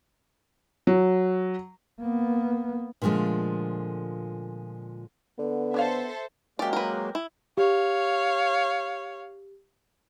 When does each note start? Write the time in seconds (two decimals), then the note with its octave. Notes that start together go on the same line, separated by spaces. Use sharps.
0.87 F#3
2.00 A#3 B3
3.02 A#2 D3 F3 G#3 A3
5.39 D3 B3
5.74 D4 A4 C5 C#5 E5 F5
6.59 F#3 G#3 A#3 C#4 G4 D5
6.73 A#4 B4
7.15 E4
7.58 G4 C#5 F5